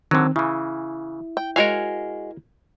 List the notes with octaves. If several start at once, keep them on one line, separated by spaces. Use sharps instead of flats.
D3 D#3 F#3 C4
C#3 E3 E4
G5
G#3 F#4 A#4 C#5 F5 G#5